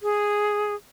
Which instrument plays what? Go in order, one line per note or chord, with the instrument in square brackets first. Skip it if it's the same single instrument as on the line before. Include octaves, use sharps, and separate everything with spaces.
[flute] G#4